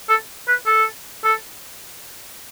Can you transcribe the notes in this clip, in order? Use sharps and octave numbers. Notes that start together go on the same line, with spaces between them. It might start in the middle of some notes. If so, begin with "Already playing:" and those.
A4
B4
A4
A4